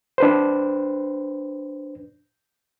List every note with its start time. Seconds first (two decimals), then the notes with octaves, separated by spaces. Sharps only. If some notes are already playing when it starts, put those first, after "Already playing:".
0.18 D4 B4 C5